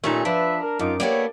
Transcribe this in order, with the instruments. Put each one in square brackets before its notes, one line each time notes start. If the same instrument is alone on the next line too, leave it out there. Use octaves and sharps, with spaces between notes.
[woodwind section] D#2 A#2 [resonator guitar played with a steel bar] A3 C#4 D#4 [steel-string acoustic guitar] E5
[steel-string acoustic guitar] F3 [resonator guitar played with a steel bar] D4 [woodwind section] B4 E5
[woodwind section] A#4
[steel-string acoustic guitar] F#2 [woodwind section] D#4 F4 D6
[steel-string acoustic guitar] A#3 B3 A4 [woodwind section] G4 C#5 [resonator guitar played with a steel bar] D5